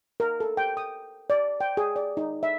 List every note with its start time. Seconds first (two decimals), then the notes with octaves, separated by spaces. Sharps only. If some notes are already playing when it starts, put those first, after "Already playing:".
0.20 A#4
0.40 A4
0.57 G5
0.77 D#6
1.30 D5
1.61 G5
1.77 G#4
1.96 D5
2.17 D#4
2.43 E5